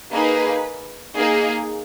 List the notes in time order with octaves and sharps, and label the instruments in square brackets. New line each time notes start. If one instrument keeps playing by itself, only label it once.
[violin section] A#3 D#4 G#4 B4
A#3 D#4 G#4